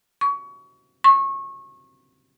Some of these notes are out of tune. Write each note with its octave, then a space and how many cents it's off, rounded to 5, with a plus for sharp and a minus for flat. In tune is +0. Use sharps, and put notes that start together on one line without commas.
C#6 +25
C#6 -25